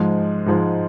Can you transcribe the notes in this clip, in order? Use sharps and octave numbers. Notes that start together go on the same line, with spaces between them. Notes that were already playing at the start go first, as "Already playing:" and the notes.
Already playing: G#2 F3 G#3
G#2 F3 G#3